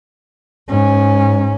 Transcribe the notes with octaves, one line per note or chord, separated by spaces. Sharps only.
G#2 C#4